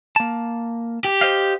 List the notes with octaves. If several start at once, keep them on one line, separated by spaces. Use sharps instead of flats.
A#3 A5
G4
C5 D#5 F5